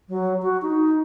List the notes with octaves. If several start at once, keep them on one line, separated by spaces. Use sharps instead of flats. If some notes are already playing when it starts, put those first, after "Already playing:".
F#3
F#4
D#4